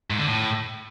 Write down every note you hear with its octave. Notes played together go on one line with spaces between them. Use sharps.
G#2
D3
A2